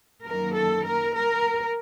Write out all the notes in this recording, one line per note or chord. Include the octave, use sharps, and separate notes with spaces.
F#2 D#3 A#3 A#4
A4
A#4
A#4